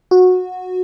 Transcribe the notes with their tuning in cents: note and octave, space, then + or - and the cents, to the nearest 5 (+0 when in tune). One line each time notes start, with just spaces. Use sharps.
F#4 -15